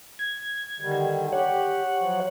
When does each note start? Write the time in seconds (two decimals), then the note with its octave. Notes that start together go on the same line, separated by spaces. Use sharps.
0.19 G#6
0.80 D3 D#3 G3
1.33 G4 C#5 F#5
1.99 F3 F#3